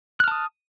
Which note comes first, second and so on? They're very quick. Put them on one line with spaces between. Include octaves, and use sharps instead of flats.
F#6 F6 A5 D#6